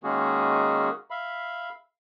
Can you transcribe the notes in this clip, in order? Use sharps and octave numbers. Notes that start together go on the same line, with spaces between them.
D#3 G#3 A#3 C#4 F#4 G#4
E5 F5 B5